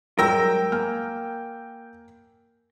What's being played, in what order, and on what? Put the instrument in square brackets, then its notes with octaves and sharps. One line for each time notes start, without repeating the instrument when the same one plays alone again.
[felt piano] G#2 F#3 G3 [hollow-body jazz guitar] A#4 [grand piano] G5 E6 A#6
[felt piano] A#3 G#5 F6